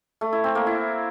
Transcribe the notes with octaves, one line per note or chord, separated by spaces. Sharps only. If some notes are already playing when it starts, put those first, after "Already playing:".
A3
E4
C4
A#3
E4